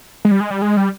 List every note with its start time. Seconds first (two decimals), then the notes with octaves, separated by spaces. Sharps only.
0.25 G#3
0.31 G3
0.40 G#3
0.51 G3
0.62 G#3
0.77 G3